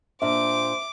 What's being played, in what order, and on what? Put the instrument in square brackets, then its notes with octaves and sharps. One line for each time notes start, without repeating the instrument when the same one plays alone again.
[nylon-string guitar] A#2 D4 [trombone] C5 [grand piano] E5 [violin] D6